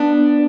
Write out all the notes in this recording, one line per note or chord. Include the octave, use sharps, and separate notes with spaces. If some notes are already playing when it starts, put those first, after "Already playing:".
Already playing: B3 D4